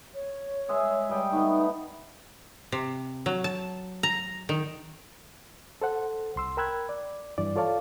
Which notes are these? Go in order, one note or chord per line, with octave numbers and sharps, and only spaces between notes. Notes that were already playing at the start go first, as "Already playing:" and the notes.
C#5
G#3 G#4 E5
G3 D#5 G5
A3 B3 D#4
C3
F#3
A5
A#5
D#3
A4 C5 F#5
C2 C6 E6
A#4 G5 B5 E6 F#6 G#6
D5
G2 E3 D5
F4 A4 C#5 D5 F5 A5